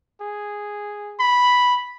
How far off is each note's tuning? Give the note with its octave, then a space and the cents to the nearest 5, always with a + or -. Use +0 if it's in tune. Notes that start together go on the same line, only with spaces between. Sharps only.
G#4 -5
B5 -5